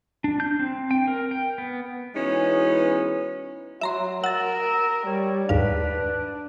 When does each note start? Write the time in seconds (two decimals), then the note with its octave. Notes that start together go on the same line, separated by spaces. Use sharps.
0.24 D4
0.40 G6
0.59 C4
0.91 G5
1.08 A#4
1.31 G5
1.58 B3
2.15 E3 G#3 B3 C#4 D#4 F#4
3.81 F#3 E5 A#5 C6
4.24 A#4 F#5 E6 A6
5.06 G3 C#5
5.49 D#2 G#2 D4 B4 F5